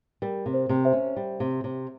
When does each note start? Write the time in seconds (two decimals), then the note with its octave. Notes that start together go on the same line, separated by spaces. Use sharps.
0.22 G3 A#4
0.46 C3
0.54 C5
0.69 C3
0.85 C5 E5
0.93 C#4
1.16 G3
1.40 C3
1.64 C3